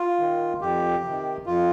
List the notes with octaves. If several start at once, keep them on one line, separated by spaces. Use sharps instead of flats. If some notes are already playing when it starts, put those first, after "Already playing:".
Already playing: F4
D#3
F2 G4
C3 D#3
F2 F4